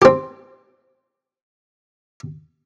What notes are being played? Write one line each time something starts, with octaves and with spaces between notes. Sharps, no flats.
C4 G4